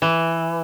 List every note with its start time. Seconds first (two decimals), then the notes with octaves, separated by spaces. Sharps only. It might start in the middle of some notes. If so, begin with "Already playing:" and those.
0.02 E3